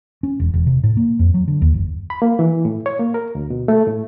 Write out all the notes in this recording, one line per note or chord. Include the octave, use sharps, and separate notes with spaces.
C#4
E1
E1
C3
A2
A#3
F2
F#3
D3
D#2
F#1
B5
A#3
E3
A2
C#5
A#3
A#4
D2
B2
A3
A2